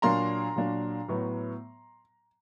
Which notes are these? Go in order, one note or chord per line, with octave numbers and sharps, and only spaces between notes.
A#2 F#3 A#3 D4 A#5 C6
A#2 F#3 A#3 D4
A2 F#3 B3